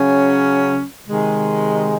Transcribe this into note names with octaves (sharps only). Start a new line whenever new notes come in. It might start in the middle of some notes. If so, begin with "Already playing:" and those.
Already playing: C#3 F#3 C#4
C3 D#3 G#3